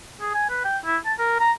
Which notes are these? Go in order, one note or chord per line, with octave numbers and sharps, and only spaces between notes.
G#4
G#5
B4
G5
E4
A5
A#4
A#5